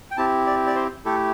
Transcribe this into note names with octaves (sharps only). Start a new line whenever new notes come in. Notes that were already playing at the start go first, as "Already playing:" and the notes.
G5
C4 E4 G4 A5
D5
D5
C5
A3 E4 G4 A4